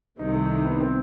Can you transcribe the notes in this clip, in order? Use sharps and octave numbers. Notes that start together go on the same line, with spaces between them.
C2 C3 D#3 D#4
A3
B3
C4